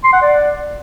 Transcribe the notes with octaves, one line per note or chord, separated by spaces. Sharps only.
C6
F#5
D5